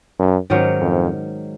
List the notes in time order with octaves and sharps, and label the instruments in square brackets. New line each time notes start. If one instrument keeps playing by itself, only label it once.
[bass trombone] F#2
[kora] G#2 D#3 F#3 C#4
[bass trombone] F2